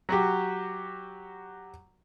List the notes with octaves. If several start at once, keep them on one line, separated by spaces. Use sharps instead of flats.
F#3 F#4 G4